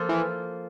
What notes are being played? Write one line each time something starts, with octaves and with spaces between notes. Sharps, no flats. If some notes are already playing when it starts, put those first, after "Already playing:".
Already playing: F3 A#3 F4 A4
E3